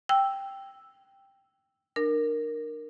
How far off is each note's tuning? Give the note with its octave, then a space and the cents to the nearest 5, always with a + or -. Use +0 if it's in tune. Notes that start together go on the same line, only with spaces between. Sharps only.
G5 +0 E6 +0
D4 +35 A#4 +0